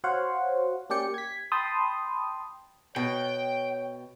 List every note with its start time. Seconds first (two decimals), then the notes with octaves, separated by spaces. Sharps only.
0.04 F#4 C5 C#5 F5 F#5
0.90 A#3 C#4 G4 D5 G5 C#7
1.14 G#6 B6
1.52 G5 A5 B5 C6 D#6
2.96 B2 C#5 G5